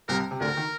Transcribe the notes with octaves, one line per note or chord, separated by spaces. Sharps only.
C2 C3 A#4
C3
D2 D3 A#4
D#3